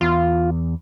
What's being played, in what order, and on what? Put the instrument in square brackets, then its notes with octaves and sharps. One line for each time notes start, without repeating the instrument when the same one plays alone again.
[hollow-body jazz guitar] E2 [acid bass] F4